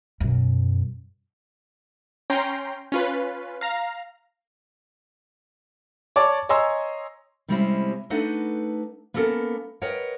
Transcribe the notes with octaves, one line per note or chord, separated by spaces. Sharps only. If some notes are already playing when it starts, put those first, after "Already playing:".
F#2 B2
C#4 G5 A#5 C6
C#4 F4 B4
F5 A#5
C#5 D5 A5 D6
C#5 D#5 G#5 A#5 C6 E6
C3 G3 G#3 C4 C#4 E4
A3 D4 D#4 A4 B4 F#5
A#3 B3 C#4 A4 A#4
A#4 B4 C#5 D#5 F#5 G5